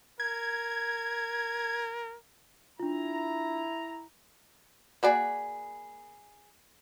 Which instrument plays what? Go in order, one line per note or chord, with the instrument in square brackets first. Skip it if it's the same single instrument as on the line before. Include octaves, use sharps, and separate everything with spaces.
[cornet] A#4 [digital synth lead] G#6
[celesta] D4 F4 [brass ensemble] E4 A#5
[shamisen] A#3 F#4 D5 [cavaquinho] G#4 B5